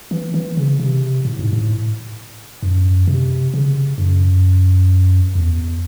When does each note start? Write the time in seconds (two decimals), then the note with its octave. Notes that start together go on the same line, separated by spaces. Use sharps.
0.11 E3
0.34 E3
0.57 C#3
0.80 C3
1.25 A2
1.39 G#2
1.53 A2
2.63 F#2
3.08 C3
3.54 C#3
3.98 F#2
5.35 E2